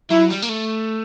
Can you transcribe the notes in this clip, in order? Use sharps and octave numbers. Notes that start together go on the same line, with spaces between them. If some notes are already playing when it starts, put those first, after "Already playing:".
F#3 E4
G3
A#3
A3